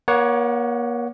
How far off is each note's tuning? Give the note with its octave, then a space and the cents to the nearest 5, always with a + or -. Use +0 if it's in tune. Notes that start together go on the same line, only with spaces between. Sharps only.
A#3 +35 C#5 +15 F#5 +0